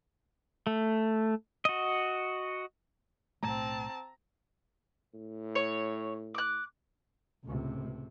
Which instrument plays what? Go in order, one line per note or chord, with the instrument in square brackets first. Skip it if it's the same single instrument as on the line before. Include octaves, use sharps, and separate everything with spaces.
[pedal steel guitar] A3
F#4 D#5
[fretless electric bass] B1 A2 A3 [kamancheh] C4 A5 [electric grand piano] A#5
[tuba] A2
[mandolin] C#5
D6 F#6
[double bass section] C#2 [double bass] A2 C3